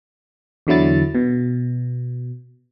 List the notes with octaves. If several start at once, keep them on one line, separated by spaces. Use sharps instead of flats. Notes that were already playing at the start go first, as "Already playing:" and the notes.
E2 D3 F#3 E4 A6
B2